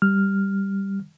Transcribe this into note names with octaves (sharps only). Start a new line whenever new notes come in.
G3 F6